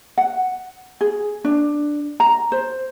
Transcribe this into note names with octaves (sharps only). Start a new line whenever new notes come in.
F#5
G#4
D4
A#5
C5